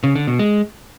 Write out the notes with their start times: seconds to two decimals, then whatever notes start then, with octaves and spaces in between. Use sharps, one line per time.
0.04 C#3
0.15 D3
0.27 B2
0.39 G#3